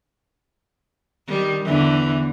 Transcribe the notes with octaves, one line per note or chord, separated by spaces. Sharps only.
D#3 G3
E2 D3 E3